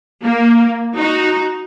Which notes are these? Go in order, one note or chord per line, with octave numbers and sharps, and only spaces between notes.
A#3
D#4 F#4